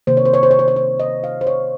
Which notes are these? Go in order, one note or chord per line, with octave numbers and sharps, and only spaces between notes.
C3 D#3 A#3 C5
C#5
C5
C#5
C5
C#5
C5
C#5
C5
D#5
F5
C5
C#5